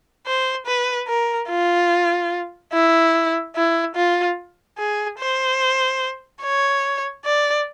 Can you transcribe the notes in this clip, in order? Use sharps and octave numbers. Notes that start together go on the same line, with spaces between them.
C5
B4
A#4
F4
E4
E4
F4
G#4
C5
C#5
D5